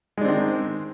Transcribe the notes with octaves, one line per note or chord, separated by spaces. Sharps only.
D#3 G#3 C4 D4